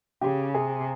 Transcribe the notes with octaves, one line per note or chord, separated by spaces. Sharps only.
C#3 G4
C3 G#4